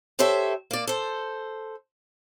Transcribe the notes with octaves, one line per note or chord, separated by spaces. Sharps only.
G4 A4 C5 C#5 E5
A#3 D5
A4 C5